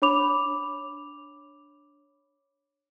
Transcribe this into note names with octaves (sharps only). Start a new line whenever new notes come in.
D4 C#5 B5 D6 F7